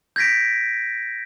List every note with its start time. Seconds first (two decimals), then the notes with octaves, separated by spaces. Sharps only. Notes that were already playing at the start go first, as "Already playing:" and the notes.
0.16 G6 G#6 A#6 B6 D7